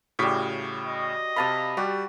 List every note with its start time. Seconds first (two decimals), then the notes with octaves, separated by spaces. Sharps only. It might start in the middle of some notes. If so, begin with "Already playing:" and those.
0.19 A2 C#3 G3 F#4 B6
0.85 D#5
1.36 C3 F5 A5 B5 D#6
1.77 G3 F#4 G4